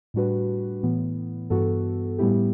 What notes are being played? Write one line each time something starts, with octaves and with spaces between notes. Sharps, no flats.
A2 G3 D4 F#4 B4
A2 E3 B3
G2 E3 B3 F#4 A4
A2 G3 B3 E4 G4